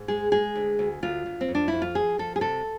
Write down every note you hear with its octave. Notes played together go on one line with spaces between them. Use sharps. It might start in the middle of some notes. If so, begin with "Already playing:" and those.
Already playing: G#2
G#3 G#4
G#3 G#4
D2
D2
D2 F4
D2
C4
F2
D4
F2 E4
F4
F3 G#4
F3 A4
G#4
C3 A4